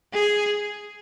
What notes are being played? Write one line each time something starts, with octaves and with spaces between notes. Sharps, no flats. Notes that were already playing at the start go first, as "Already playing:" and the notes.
G#4